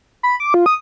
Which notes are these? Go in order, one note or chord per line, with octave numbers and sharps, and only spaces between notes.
B5
D6
F4
D#6